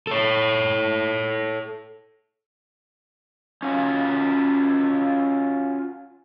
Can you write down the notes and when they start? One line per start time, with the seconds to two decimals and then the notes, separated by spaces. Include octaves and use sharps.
0.07 A4 C#5
3.63 C#4 F4 F#4